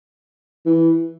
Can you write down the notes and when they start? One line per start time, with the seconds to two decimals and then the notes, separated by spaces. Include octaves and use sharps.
0.66 E3